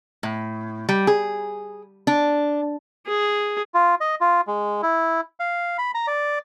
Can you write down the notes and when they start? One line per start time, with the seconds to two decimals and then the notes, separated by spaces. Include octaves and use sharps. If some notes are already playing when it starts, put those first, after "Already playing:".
0.23 A2
0.89 G3
1.07 G#4
2.07 D4
3.07 G#4
3.74 F4
4.01 D#5
4.21 F4
4.47 G#3
4.83 E4
5.40 F5
5.78 B5
5.94 A#5
6.07 D5